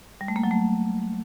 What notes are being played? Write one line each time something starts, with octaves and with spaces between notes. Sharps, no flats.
G3
A3
A#3
F#3
A3